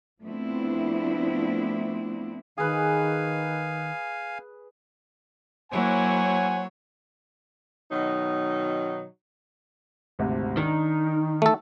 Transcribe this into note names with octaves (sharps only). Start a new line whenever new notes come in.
F3 A3 B3 C4 D4 E4
D#3 G#4 B4 F5 G#5
F#3 A#3 E4 C5 C#5 F#5 G#5
B2 D#3 F#3 D#4
G#1 D2 C3
D#3 D4 D#4
A3 A4